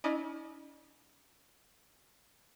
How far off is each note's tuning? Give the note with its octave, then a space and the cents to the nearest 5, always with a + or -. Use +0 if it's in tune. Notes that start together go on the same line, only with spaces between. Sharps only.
C#4 +40 E4 -40 D#5 -35